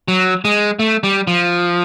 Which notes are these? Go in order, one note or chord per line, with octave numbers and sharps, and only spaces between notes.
F#3
G#3
A3
G3
F3